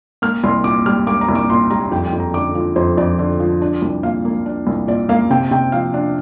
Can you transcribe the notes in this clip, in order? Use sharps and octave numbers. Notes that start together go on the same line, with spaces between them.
A#3 F6
C2 C6
A#2 D6
G3 F6
A#3 D6
A#5
C2
D6
A#2 C6
G3 A#5
F2 G5
G5
F2
A#5
D3 D6
F3
F2 C5
F2 D5
D3
F3
D4
C2
A#2 F5
A#3
D4
C2
A#2 D5
A#3 F5
C3 G5
C3 G5
F3 F5
D4